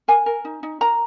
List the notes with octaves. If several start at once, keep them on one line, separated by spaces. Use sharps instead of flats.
A#4 G#5
A#4
D#4
D#4
A#4 A#5